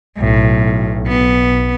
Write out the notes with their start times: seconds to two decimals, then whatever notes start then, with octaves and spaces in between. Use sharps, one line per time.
0.18 B1 A2
1.08 B3